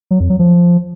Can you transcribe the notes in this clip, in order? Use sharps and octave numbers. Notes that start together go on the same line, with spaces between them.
F#3
F2
F#3
F3